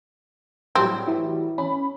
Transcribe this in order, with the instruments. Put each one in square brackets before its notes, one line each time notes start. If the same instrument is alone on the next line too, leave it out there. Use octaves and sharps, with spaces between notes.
[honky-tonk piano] A2 F#3 G3 [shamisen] C4
[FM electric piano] E3
[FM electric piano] C#4 [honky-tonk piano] B5